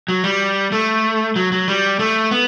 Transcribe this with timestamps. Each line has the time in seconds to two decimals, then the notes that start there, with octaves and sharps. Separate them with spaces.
0.08 F#3
0.24 G3
0.72 A3
1.36 F#3
1.52 F#3
1.68 G3
1.99 A3
2.31 B3